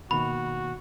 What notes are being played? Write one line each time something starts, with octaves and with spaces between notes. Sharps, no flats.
B2 D#3 A#3 F#4 B5